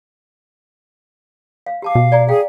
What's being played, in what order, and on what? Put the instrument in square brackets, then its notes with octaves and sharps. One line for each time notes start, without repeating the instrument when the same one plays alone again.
[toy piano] F5
[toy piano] G4 A5 D6 [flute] F5
[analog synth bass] B2
[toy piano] D5 G#5 A#5
[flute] G#4 [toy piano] F5 G5